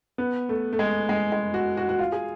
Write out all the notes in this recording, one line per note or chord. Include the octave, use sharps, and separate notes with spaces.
B3
A3
A3
G#3
G#3
G#3
F#4
F#4
F#4
F4
G#4